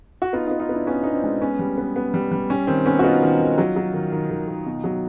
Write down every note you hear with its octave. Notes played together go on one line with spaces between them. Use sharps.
F#4
B3 D#4 F4
D#4 F4
B3
D#4 F4
B3 D4 E4
B3 C#4 D#4
B3 D#4
C4 D4
G#3
B3 C#4
G3
B3
B3
G3
G3
G3 C#4
D#3 C4
B3 C#4
F#4
B3 D#4 F4
D#3
D#3
F#3
F#3
D#3
D#3
D#3
D#3
B2
F#3